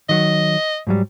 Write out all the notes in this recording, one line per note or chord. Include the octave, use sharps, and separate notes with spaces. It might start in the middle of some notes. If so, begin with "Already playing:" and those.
D#3 F#3 D#5
G#2 F#3 G3